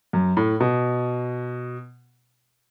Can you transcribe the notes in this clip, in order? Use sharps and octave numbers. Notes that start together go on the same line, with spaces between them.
F#2
A2
B2